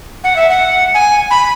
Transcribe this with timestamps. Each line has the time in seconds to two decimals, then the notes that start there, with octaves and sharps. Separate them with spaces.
0.24 F#5
0.36 E5
0.50 F#5
0.94 G#5
1.31 B5